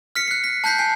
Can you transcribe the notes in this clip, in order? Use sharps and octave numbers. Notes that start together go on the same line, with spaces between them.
F6 B6 C#7
F#6 C7
B6
A5 F#6 G6 B6 C7
G#5 C7